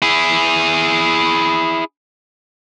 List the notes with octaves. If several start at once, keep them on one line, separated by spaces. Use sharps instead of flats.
E4 G#4